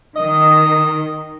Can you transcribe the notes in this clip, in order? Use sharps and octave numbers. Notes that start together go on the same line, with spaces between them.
D#3 D#5